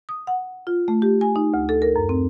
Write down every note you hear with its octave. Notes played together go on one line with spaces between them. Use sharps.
D#6
F#5
F4
A3
G4
G#5
D#4
D2
A4
A#4
F#2
C4